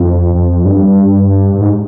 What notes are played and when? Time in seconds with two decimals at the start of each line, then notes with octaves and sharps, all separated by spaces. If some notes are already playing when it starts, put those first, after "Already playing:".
Already playing: F2
0.35 F2
0.65 G2
1.54 G2
1.61 G#2